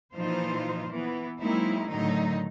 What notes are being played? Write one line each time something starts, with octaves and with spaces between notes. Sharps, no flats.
A#2 E3 F3 D#4 F4 C5
E3 B3
F#3 G#3 A#3 C4 D#4 E4
A2 D3 D#3 F#3 A3 D#4